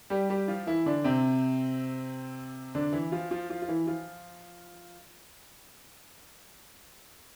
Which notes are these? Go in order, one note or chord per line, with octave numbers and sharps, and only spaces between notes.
G3 G4
G3 G4
F3 F4
E3 E4
D3 D4
C3 C4
D3 D4
E3 E4
F3 F4
F3 F4
F3 F4
F4
E3 E4
F3 F4